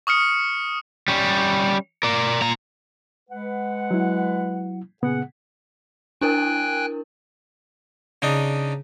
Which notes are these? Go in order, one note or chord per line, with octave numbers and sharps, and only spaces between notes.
C#6 D#6 F6 C#7
G3 C#4
A#4 D5
A#2 A#5
G#3 B4 F#5
F#3 E4
A#2 C#3 B3 G#4 F#5
D4 E4 A#4 G5 G#5 F#6
C#3 D4 D#4